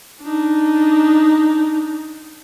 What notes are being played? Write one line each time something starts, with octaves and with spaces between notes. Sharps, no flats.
D4 D#4